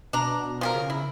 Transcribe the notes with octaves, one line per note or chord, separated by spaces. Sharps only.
B2 D4 A#5
F3 G#4 A#4
C#3
E4